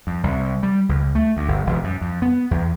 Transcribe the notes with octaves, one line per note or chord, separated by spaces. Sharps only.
F2
C2
G3
C#2
A3
D2
G1
E1
F#2
F2
B3
E2